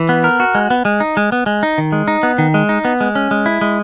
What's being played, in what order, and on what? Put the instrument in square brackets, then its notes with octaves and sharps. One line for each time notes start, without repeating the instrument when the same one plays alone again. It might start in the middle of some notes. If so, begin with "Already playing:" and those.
Already playing: [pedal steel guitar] E3
B3
A#4
F#4
G#3
B3
G#3
D#4
G#3
B3
G#3
D#4
D#3
G#3
D#4
B3
D#3
G#3
D#4
B3
G#3
C#4
G#3
E4
G#3